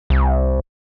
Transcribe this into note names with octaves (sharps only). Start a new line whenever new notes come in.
C2